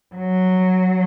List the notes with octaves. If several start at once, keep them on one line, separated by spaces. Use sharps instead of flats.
F#3